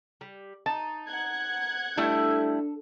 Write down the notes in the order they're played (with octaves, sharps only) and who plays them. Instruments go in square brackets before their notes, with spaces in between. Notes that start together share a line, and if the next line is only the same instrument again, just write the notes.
[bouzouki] G3
[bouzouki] D#4 [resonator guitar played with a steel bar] A5
[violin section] F#5 F#6 G#6
[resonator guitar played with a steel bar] G3 A3 E4 [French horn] D4 [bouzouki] A4